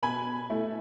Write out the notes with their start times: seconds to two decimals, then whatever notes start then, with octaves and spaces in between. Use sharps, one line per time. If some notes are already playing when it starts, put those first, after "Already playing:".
0.03 B2 G#5 B5
0.50 A3 E4